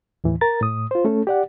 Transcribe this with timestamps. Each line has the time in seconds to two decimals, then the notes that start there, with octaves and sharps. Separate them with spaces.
0.24 D#2 A2 E3
0.41 A#4 A#5 A6
0.61 A2 D#6
0.91 F4 C5
1.05 A3 C#4 A4
1.27 G4 D5 F#5